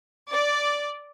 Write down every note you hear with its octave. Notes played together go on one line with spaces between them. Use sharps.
D5